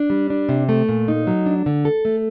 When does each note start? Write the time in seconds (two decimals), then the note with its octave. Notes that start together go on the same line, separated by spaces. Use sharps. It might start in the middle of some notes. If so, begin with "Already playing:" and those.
Already playing: D4
0.10 G3
0.30 D4
0.49 C3
0.69 A3
0.89 A#2
1.08 D#4
1.27 F#3
1.46 D4
1.66 D3
1.85 A4
2.05 A3